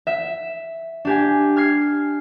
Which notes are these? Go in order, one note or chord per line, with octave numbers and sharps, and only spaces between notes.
E5
D4 G4 G#5
F6 G#6 C7